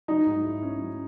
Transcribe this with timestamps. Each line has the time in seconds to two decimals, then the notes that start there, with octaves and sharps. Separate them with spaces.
0.08 F#3 D#4
0.26 G#2
0.44 E4
0.62 C#4
0.80 F#3